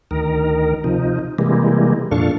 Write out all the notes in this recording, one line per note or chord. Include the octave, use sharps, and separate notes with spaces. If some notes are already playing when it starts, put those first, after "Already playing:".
D2 D#3 A#4
C3 F3 D#4
C3 E3 G3 G#3 A#3
F2 A#2 D4 A4 F5 C#6